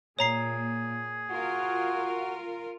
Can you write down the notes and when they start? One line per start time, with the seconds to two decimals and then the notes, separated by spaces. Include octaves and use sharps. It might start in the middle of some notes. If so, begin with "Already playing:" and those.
0.19 A#2 A#3 G#4 C#5 A#5 C7
1.31 F4 F#4 A#4